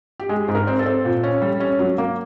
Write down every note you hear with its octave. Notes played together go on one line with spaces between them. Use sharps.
G4
G#3 G#4
G#2
A#4
C4
A4
C4
A#2
C#4
G3
C#4
F#3
A#3